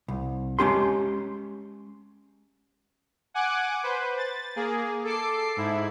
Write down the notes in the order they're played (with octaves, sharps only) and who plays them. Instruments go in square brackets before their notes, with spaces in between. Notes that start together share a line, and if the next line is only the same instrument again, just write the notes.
[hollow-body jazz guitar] C2
G#3 C#4 G4 C6
[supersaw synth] F#5 G#5 D6 F#6
B4 C5
A6
A#3 G#4
A4 D6 C7
G#2 E4